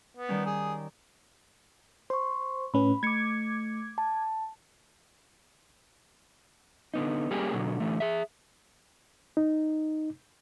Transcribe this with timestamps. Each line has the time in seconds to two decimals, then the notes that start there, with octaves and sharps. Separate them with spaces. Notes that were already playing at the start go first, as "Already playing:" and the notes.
0.17 B3
0.29 D#3 G3 C#4
0.45 G#4
2.10 C5 C6 C#6
2.74 A2 C#4 B4 B5
3.03 A3 D6 G#6 C#7
3.98 A5
6.94 D3 B3 D#4
7.31 G3 A#3 C#4 G4 G#4
7.54 B2 D3 F#3
7.80 D3 E3 A3
8.00 G#4 E5
9.37 D#4